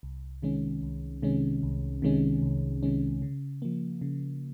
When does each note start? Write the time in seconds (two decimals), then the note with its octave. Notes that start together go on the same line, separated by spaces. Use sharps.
0.03 C2
0.42 C3 D#3 G#3 C#4
0.83 C2
1.22 C3 D#3 G#3 C#4
1.63 C2
2.02 C3 D#3 G#3 C#4
2.42 C2
2.83 C3 D#3 G#3 C#4
3.22 C#3
3.62 F3 A#3
4.01 C#3